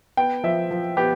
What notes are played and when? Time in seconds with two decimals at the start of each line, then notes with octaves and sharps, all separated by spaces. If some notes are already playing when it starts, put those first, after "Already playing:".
0.17 B3 G5
0.44 F3 E5
0.71 F3
0.97 B3 G4